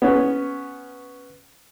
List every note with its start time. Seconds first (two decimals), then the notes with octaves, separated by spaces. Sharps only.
0.02 B3 C#4